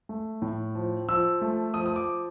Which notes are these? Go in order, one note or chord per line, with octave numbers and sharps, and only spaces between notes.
A3
A2
F3
F3 E6
A3
F3 D#6
D#6
D6